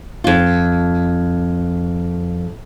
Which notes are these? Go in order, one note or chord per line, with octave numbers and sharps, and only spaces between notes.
F2 F4